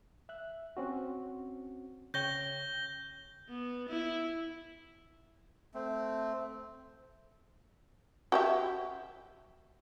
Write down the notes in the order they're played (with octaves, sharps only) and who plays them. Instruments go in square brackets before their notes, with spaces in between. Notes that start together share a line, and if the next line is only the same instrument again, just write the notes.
[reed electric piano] E5 F#6
C4 C#4 F#4
[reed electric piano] C#3 C#5 G5 [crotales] G6 A#6 G7
[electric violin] B3
E4
[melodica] A3 C4
[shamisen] F#4 G4 E5